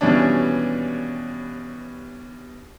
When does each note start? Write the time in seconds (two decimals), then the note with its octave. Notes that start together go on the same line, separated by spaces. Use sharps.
0.01 D#2 B2 E3 G3 C#4 D4